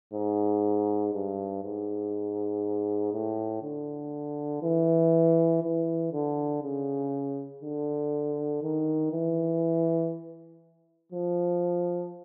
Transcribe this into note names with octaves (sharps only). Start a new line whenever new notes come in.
G#2
G2
G#2
A2
D3
E3
E3
D3
C#3
D3
D#3
E3
F3